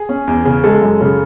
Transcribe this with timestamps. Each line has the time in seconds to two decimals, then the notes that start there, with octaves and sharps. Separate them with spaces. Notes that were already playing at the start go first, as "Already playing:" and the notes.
Already playing: G#4
0.09 C#4
0.28 E2
0.45 C#3
0.64 G#3 A4
0.82 F#2
1.01 C#3